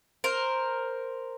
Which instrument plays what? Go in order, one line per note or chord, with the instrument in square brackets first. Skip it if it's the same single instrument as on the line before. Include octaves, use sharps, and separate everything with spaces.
[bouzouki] A#4 C5